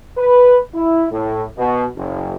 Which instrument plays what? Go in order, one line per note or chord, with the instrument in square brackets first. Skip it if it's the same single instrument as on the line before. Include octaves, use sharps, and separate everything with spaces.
[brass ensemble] B4
E4
A2
B2
F#1